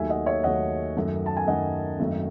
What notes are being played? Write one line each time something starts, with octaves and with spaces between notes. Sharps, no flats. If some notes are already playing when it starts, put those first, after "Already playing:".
Already playing: D#2 D#3 F#3 A3 E5 G#5
D#5 F#5
C#5 E5
D#2 D#3 F#3 A3 D#5 F#5
F#2 D#3 A3
A5
G#5
F#2 D#3 A3 D#5 F#5
G#1 F#2 D#3 A3